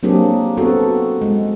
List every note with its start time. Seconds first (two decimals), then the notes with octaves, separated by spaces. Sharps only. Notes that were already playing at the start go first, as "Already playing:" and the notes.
0.03 F#3 A#3 C4 D4 G4 G#4
0.57 B3 C4 F#4 A4
1.22 G#3